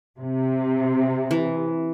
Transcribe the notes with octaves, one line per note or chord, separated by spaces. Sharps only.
C3
E3